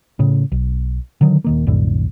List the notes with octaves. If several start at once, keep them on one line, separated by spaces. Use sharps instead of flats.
A2 C#3
B1
D3 D#3 F#3
D#1 D#3 A#3
B1 F2 A2 D3